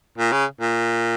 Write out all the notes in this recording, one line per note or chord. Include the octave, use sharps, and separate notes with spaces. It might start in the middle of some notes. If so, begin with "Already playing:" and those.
A#2
C#3
A#2